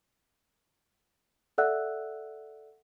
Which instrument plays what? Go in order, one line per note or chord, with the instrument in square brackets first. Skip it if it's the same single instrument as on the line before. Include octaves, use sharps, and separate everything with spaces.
[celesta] A4 D5 E5 F#5 E6 F#6